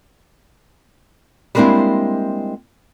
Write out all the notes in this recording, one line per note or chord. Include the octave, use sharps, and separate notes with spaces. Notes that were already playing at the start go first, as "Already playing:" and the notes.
G3 G#3 A#3 C4 D4 E4